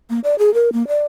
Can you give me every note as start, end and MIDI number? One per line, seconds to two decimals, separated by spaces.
0.10 0.20 58
0.24 0.35 74
0.39 0.53 68
0.54 0.73 70
0.73 0.87 58
0.88 1.06 74